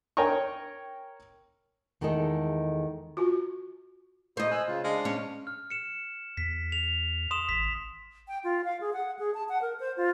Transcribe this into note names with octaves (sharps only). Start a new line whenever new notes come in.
A#4 C#5 G5 G#5 A#5 C#6
E2 D#3 G#3 A3 A4 D#5
F4 F#4
A3 E4 C5 D#5
G#5 E6 F#6
C#3 F4
G#3 D4 F5
C#4
F6
C#7 E7
E2 B6
F7
C6 D#6 E7
G#1 B6
G5
F4
F5
G#4
F#5
G#4
A5
F#5
A#4
C5
F4